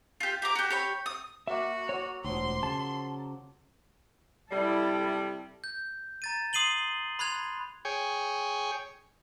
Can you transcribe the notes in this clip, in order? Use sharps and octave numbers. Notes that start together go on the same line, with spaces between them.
F4 G4
G4 A#5 D6
F#4 G4
G4 C#5 B5
D#6
F#3 A#3 F#4 E5
F#3 C#5
E1 D2 F3 F#3 C6
C#3 A5
C3 G3 E4 A4
G6
A#5 A6 D#7
C6 D#6 C7 D#7 F#7 G7
B5 C6 F#6 G#6 F7
G#4 C#5 G5